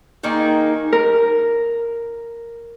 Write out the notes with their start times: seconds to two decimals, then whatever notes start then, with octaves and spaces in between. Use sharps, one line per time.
0.24 D#3 A#3 D#4 G#4
0.93 A#4